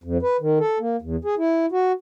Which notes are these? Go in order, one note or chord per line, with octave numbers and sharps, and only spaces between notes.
F2
B4
D#3
A4
A#3
E2
G#4
E4
F#4